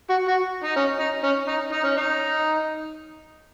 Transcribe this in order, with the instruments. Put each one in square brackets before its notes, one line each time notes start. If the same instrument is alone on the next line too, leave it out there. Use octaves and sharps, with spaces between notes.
[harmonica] F#4
F#4
D#4
C#4
D#4
C#4
D#4
D#4
C#4
D#4